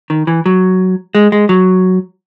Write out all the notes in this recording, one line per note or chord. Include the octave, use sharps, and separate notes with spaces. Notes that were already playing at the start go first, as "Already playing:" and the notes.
D#3
E3
F#3
G#3
G#3
F#3